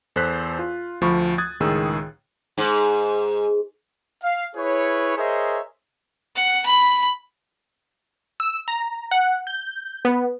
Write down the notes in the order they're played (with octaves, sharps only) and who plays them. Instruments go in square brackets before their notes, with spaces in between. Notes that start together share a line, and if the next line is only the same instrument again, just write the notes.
[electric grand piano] E2 A4 C5 F#6 B6
F4
D2 F3 A3 B5 C#6
D#6 F#6 G#6 A6
C#2 A2 D#3 G#4 E6
[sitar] G#2
[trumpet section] F5
E4 G#4 B4 C#5
G#4 A#4 C5 C#5 D#5 E5
[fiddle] F#5
B5
[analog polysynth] E6
A#5
F#5
G6
B3